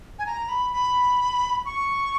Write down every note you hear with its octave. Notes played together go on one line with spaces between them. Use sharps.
G#5
A#5
B5
B5
C#6